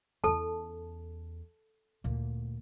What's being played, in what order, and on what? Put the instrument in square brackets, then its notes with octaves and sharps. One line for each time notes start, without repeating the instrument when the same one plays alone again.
[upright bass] E2 C#4 [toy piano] A4 A5
[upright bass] D2 A#2